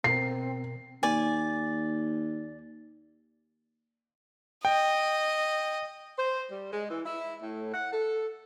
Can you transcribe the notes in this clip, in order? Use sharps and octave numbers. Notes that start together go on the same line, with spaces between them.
B2 C4 A#4 C7
D#2 D5 G#5
D#5 G5
C5
G3
G#3
E3
E4
A2
F#5
A4